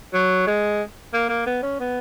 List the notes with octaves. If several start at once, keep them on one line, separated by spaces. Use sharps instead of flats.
F#3
G#3
A#3
A#3
B3
C#4
B3